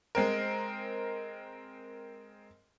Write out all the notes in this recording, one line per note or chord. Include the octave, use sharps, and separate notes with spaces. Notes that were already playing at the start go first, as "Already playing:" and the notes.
G#3 C4 A#4